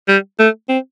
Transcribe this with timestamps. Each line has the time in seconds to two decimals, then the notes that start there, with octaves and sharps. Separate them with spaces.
0.08 G3
0.39 A3
0.69 C4